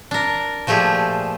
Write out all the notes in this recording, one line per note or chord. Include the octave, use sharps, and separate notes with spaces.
D4 A#4
A#2 F3 A3 G4 G#4